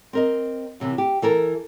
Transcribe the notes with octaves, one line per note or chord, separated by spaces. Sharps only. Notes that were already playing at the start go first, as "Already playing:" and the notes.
C4 A#4 D#5
F#2 C3 E3
G4
E3 A4 A#4